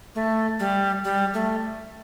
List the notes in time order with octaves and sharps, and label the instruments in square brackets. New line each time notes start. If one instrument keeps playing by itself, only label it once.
[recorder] A3
G3
G3
A3